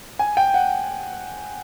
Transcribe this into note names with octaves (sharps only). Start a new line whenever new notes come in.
G#5
G5
F#5